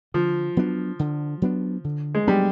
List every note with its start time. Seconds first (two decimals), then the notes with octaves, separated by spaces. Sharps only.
0.14 D3 F3
0.57 F#3 B3 D4
0.99 D3
1.42 F#3 B3 D4
1.84 D3
2.15 G#3
2.27 F#3 G3 B3 D4